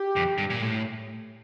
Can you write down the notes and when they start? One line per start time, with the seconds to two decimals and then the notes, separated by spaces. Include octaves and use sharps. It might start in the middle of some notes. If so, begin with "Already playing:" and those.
Already playing: G4
0.16 F2
0.38 G2
0.50 A#2
0.61 A2